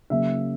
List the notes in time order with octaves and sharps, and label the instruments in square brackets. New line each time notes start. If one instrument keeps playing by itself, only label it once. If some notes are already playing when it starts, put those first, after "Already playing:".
[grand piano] C#3 F#3 A#3 E5